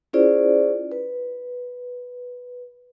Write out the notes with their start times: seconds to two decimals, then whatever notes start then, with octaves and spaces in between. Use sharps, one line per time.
0.13 C#4 E4 F4 G#4 C5 D5
0.92 B4